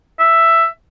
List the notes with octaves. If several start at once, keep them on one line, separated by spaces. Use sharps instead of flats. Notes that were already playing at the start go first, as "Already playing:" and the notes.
E5